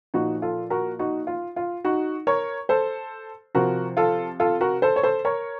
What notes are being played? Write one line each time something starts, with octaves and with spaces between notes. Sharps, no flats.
A#2 F3 D#4 F#4
F4 A4
F#4 A#4
D#4 F#4
F4
F4
D#4 F#4
A#4 C#5
A4 C5
C3 F3 F#4 A#4
F4 A4
F4 A4
F#4 A#4
A4 C5
C#5
A4 C5
A#4 C#5